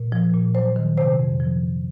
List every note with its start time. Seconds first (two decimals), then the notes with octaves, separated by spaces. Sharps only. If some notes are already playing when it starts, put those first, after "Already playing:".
Already playing: A#2
0.12 F3
0.34 A#2
0.55 F#3 C5
0.76 D#3
0.98 C3 C5
1.19 F2
1.40 F3